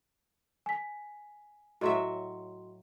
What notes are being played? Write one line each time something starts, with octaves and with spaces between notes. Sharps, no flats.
G#5 B6
A2 F#3 F#4 D#5 E5 C6